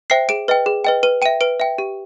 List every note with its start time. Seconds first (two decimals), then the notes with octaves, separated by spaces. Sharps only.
0.10 C5 E5 G5 C7
0.29 G#4 D7
0.48 B4 D#5 G5
0.66 G#4
0.84 B4 D#5 G5
1.03 B4 D#7
1.22 G5 D#7
1.26 E5
1.41 B4 D7
1.60 E5 G5
1.78 G4